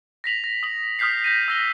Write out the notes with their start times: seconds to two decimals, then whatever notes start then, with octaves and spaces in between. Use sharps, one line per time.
0.24 A#6 B6 F7 F#7
0.44 A#6
0.63 D#6 F#7
0.99 D#6 F6 G6 B6 C7
1.24 G6 A#6 D#7
1.48 E6 A#6 G7